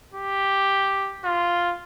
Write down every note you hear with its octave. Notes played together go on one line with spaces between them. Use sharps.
G4
F4